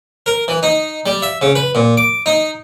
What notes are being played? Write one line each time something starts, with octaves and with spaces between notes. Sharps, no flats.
A#4
E3
D#4
G3
E5
C#3
B4
A#2
D6
D#4